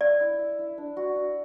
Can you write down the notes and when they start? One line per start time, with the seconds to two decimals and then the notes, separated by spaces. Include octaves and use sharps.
0.01 D5 E5
0.21 E4
0.39 E5
0.59 E4
0.78 D4
0.97 F#4
1.16 F#4